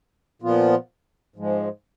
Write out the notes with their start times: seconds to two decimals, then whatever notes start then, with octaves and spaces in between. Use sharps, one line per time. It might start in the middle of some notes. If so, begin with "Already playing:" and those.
0.42 A#2 F3 B3 F4
1.36 G#2 F3 G#3